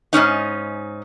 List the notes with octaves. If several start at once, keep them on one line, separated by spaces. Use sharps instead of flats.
G#2 B2 C#4 D#4